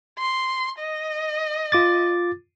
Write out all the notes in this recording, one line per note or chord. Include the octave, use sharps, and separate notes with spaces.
C6
D#5
F4 D6 A6